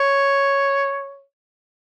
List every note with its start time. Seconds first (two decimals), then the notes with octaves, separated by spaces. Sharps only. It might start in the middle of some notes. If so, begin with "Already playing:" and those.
Already playing: C#5